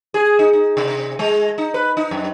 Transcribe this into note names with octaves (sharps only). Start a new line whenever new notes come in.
G#4
D#4
D#4
C3
G#3
D#4
B4
D#4
F#2